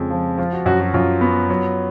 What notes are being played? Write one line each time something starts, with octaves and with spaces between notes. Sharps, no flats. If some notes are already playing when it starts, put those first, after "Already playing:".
Already playing: F2 C#3 G#3
F3
F3 F4
F#4
F#2 F#4
F#4
F#2 F4
B3
F#3